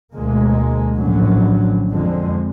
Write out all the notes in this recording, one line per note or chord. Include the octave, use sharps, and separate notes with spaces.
D2 B2 G#3 A#3
A#1 A2 D3 F#3 C#4
F2 D3 G#3